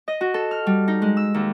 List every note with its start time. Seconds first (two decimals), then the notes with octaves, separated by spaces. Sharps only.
0.08 D#5
0.21 F#4
0.34 A4
0.51 F6
0.67 G3
0.88 D#4
1.02 G#3
1.17 E6
1.34 D#2